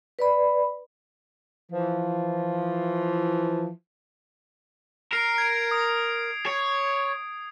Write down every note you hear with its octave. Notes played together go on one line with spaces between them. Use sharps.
B4 D5 B5
E3 F3
A#4 C7 D7
G#6 D7
D#6
C#5